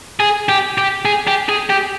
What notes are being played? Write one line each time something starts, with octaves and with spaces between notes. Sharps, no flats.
G#4
G4
G4
G#4
G4
G#4
G4